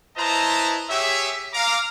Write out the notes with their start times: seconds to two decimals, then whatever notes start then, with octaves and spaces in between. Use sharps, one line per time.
0.17 E4 B4 C5 D#5 A5 A#5
0.89 G4 G#4 C#5 E5
1.54 F5 A#5 D6